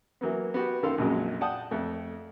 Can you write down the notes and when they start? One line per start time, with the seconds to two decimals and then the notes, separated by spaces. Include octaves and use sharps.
0.21 E3 F#3 A#3 B3
0.54 B3 F#4 G4
0.83 F#2 D#3 A#3 A4 F5 C6
0.98 A#1 F2 A#2 C#3 F#3 G#3
1.41 D5 F#5 G5 A5 D#6
1.71 F2 A3